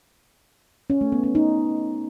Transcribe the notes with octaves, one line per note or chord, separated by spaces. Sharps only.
C#4
A3
B3
C#4
D#4